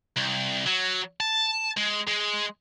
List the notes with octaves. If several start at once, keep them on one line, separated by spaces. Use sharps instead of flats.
C2
F#3
A5
G#3
G#3